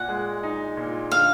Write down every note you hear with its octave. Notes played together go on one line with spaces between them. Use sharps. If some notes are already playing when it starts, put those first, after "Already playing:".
Already playing: A#2 F#5
G#3
D#4
A#2
D3 F5